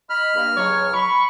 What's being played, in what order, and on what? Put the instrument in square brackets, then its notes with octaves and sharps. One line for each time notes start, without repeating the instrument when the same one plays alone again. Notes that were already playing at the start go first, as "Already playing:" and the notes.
[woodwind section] D#5 B5 [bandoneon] F6
[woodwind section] G2 A#3
[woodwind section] C#2 F#3 [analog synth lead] C#5
[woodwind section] B5 [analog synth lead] C#6